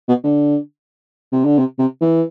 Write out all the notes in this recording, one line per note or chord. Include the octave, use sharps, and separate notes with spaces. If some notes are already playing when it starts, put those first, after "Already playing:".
B2
D3
C3
D3
C3
C3
E3